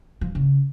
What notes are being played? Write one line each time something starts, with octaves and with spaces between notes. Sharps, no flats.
F3
C#3